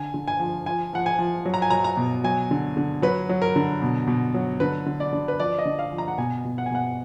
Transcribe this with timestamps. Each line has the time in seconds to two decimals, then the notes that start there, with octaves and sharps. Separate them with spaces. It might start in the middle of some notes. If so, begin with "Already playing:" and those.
Already playing: D3 G#5
0.14 D3
0.28 G#5
0.40 F3
0.66 F3 G#5
0.93 F3 F#5
1.06 G#5
1.19 F3
1.45 F#3
1.54 A#5
1.62 G#5
1.70 F#3 A#5
1.84 A#5
1.97 B2
2.24 F#3 G#5
2.51 D3
2.77 D3
3.02 F#3 B4
3.29 F#3
3.42 A#4
3.56 D3
3.82 B2
4.08 B2
4.34 F#3
4.60 D3 B4
4.86 D3
5.00 D5
5.13 D3
5.28 B4
5.39 F3 D5
5.59 D#5
5.65 D3
5.79 F5
5.92 F3
5.98 A#5
6.08 F#5
6.18 B2 G#5
6.45 B2
6.58 F#5
6.66 G#5
6.71 B2 F#5